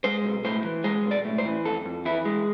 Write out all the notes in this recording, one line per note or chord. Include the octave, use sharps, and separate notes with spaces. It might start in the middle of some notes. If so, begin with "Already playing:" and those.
G#3 C5
B1
A2 C5
E3
G#3 C5
B1
D5
A2
C5
E3
F2 A4
F2
E3 E4
G#3